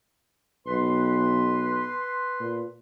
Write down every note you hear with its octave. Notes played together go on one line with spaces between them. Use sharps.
B1 B4 C6
A#2